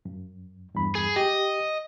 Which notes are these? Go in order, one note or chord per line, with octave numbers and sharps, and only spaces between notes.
F#2
E2 G2 B5
G#4
G4 D#5